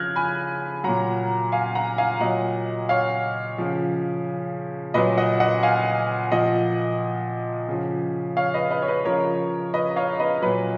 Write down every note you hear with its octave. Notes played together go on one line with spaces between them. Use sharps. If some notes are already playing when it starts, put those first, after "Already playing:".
Already playing: C#3 F3 F6 F#6 G#6 A#6
G#5 B5
A#2 F#3 F#5 A#5
F5 G#5
F#5 A#5
F5 G#5
A#2 F#3 D#5 F#5
C#5 F5
C#3 F3
A#2 F#3 B4 D#5
D#5 F#5
D#5 F#5
F5 G#5
A#2 F3 D#5 F#5
C#3 F3
C#5 F5
B4 D#5
B4 D#5
C#5
B4
C#3 F3 A#4 C#5
B4 D#5
C#5 F5
B4 D#5
A#2 F#3 B4